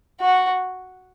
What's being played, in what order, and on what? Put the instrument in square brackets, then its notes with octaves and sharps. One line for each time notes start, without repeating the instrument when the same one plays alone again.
[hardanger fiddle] F#4